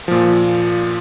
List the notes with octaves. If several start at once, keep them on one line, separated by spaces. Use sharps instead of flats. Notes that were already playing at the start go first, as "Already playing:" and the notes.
A#2 F3